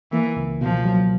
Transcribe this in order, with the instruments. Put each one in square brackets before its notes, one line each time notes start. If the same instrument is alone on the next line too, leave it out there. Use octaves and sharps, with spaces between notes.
[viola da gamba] E3 [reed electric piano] A#3
[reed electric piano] C#2
[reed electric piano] B2 [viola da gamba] F3
[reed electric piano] F#3